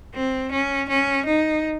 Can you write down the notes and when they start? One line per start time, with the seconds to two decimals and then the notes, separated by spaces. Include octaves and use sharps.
0.15 C4
0.51 C#4
0.89 C#4
1.26 D#4